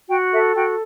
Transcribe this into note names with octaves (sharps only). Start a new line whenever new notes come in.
F#4 G5
A4 E5
F#4 G5